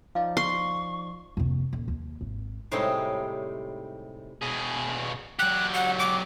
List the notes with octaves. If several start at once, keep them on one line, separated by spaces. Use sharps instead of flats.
F3 D#4 D5 F5
C6 C#6
F1 D#2
D#1
D#2
G#1
A2 C3 G3 G#3 D#4 C#5
B2 G#4
F#3 G4 F#6
F#5
D6